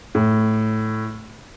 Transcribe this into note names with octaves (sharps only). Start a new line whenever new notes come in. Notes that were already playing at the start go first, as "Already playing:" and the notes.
A2